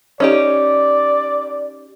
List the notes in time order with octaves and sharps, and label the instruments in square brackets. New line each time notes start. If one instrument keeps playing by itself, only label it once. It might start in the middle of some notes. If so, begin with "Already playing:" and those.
[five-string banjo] C#4 D#4 G4 [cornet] D5